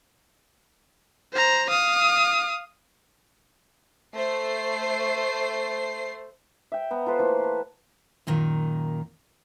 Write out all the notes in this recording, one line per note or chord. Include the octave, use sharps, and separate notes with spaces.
C5 A#5
F5 D#6
A3 C5 C7
E5 G5
B3 A#5
F4 A4 B4 C5
E3 A3 A#3
B4 A5
F#2 A#2 D#3